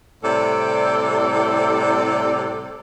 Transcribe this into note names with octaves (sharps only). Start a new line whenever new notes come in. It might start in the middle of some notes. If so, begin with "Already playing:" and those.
A2 C3 G3 A4 D5